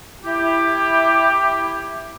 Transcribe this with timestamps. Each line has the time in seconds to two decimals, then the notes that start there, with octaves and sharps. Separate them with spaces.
0.24 E4 G4